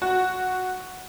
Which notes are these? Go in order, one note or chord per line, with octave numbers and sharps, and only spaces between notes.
F#4